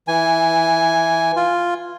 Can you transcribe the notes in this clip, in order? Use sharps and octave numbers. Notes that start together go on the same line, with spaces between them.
E3 G#5
F4